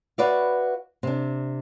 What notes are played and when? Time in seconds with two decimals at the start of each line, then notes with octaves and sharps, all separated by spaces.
0.18 F#4 B4 C#5 D5 E5 F5
1.03 C3 D4